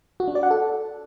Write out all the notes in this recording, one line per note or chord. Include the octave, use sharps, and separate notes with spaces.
F#4
D4
D5
F#5
A4